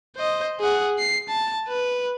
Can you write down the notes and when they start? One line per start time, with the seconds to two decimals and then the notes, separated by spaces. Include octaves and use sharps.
0.16 C5 D#5
0.60 G#4 F#5
0.99 C7
1.29 A5
1.68 B4